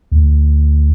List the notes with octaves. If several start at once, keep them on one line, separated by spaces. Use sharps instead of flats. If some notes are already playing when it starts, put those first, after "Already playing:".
D2